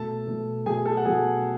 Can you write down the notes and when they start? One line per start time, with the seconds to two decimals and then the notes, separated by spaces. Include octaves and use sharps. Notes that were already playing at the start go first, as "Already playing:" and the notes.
Already playing: B2 A3 A4 A5
0.27 B2 A3
0.66 B2 F#3 A3 G#4 G#5
0.85 A4 A5
0.97 F#5
1.05 B2 F#3 A3 G#4 G#5